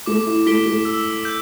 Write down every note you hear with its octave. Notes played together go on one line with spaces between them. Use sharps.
A3 D6
E4
A3 B6 D7 G7
A3
E6
G6